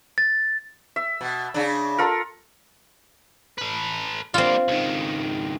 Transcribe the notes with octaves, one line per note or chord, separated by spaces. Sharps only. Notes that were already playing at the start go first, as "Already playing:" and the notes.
A6
E5
B2
C#3 D4
F4 A4 A#4
A4 B4
G3 A#3 C4 F4
C#2 D#3